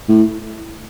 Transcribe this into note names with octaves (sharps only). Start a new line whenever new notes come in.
A2